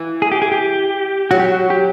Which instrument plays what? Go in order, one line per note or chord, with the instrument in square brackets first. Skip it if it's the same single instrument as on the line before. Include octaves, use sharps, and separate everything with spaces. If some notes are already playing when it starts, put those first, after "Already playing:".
Already playing: [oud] E3
[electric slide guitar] G#4
G4
G#4
G4
[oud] F#3 [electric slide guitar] F#4
[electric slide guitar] G4
F#4
G4